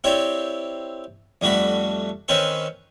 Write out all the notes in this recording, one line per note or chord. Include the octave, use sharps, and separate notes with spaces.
C4 E4 G4 C#5 D5 G5
F2 G3 A3 D4 F#4 B5
D#3 C4 C#4 B4 C5 C#6